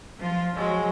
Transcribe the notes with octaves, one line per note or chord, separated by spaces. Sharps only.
F3 F4
F3 F#3 G#3